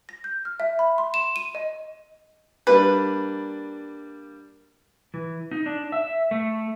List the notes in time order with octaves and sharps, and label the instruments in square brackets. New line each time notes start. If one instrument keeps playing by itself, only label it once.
[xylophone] A#6
G6
F6
E5
B5
C6
E7
D#7
D#5
[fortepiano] G3 A#3 D4 [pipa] B4
[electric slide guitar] E3
D#4
D4
E5
A3